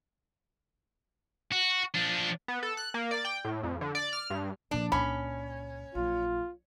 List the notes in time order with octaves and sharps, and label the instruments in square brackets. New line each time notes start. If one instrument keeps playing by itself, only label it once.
[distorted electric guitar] F#4
F3 D4
[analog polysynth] B3
A4
F#6
A#3
D5
G5
A2
F2
D3
D5
F6
G2
[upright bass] A#2 F3 [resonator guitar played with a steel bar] D4
[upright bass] C#2 A#2 [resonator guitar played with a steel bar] C#4 [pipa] B5
[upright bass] A#1 F#3 [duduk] F4